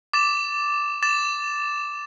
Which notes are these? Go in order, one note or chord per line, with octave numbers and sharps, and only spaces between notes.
D6 A6 E7
D6 A6 E7